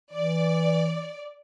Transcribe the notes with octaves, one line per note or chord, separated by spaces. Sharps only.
E3 D5